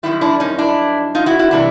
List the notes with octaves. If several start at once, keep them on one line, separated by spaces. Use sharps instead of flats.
F#2 D#3 G3 E4
D4 E4
C#4 D#4
D4 E4
D#4 F4
E4 F#4
E4 F#4
C3 E3 G3 D4 E4